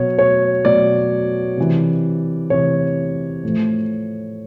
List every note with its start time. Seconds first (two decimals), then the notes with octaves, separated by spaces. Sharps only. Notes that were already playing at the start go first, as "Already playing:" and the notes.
Already playing: B2 F#3 C#5
0.19 C#5
0.65 B2 F#3 D5
1.57 C3 E3
2.50 C3 E3 C#5
3.44 A2 F3